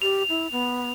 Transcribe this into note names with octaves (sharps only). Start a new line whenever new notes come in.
G4 F7
E4
B3